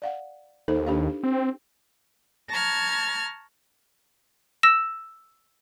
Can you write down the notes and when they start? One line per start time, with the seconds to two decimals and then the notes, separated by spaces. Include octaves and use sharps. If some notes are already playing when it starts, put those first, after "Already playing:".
0.02 D5 F5 F#5
0.68 D#2 D#4 A4 C5
0.87 D4 G4 F5
1.23 C4
2.49 A5 A#5 C#6 F6 G#6
4.63 E6 A#6 E7